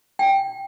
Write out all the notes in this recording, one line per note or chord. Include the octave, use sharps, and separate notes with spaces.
G5